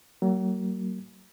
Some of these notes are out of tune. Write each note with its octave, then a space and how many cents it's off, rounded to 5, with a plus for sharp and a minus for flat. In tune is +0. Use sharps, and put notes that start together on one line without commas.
F#3 +35 A#3 -20